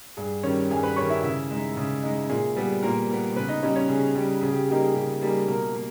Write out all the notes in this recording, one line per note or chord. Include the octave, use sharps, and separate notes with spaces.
G2 G#4
D#3 G3 C#4 C#5
G2 G#4 G#5
B4 B5
D#3 G3 C#5 C#6
E4 E5
C#3 E4 E5
G#3 D#4
C#3
G#3 D#4
A#2 G#4
G3 B3 G#4
A#2 A#3 A#4
G3 B3
C#3 B3 B4
D#4 D#5
G3 C#4 D#4 D#5
C#4 C#5
C#3 G#4
G3 C#4 G4
C#3 G#4
G4
G#4
G3 A#3 D#4 G4
G#4
C#3 G4
G3 A#3 D#4 G#4
B2 A#3 A#4
A#3